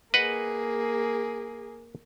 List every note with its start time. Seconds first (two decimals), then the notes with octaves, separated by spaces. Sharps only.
0.14 A#3 G#4 B4 D#5 F#5